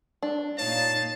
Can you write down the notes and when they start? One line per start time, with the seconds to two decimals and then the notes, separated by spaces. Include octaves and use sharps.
0.22 D4
0.58 A#2 D#4 C#5 F5 A5